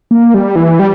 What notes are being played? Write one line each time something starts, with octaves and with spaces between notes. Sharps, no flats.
A#3
G3
E3
G3